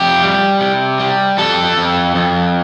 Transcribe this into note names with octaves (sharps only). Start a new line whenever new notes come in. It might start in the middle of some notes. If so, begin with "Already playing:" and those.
Already playing: F2 G4
G3
C3
G3
F2 A4
F2
F2